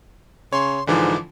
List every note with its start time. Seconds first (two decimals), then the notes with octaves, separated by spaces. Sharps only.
0.53 C#3 C#5 C6
0.87 G#2 D3 E3 F3 D6